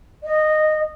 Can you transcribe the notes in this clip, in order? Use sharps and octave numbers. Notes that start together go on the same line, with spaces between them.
D#5